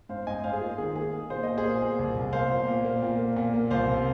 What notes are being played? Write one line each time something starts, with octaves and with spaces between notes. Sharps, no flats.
G#2 C5 F5
G#2 D#5 G#5
G#2 C5 F5
G#4
A#3 F4
D#3 G#4
A#3 G#4
A#3
A#2 C5
A#2 D#5
G#4 C5
A#3
A#2
C2
C2
A#3 C5 F5
A#2
A#2
A#3
A#2
A#3
A#2
A#3
C2 C5 F5
C3